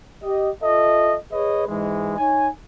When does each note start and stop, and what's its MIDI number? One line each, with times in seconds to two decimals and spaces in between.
0.22 0.49 67
0.22 0.49 75
0.62 1.16 65
0.62 1.16 69
0.62 1.16 75
0.62 1.16 76
1.32 1.66 68
1.32 1.66 71
1.32 1.66 73
1.32 1.66 75
1.68 2.14 44
1.68 2.14 52
1.68 2.14 56
2.18 2.48 63
2.18 2.48 73
2.18 2.48 80